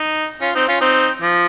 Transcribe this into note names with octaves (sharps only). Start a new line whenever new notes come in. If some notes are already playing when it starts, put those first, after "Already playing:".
Already playing: D#4
C#4 F4
C4 D#4
C#4 F4
C4 D#4
F3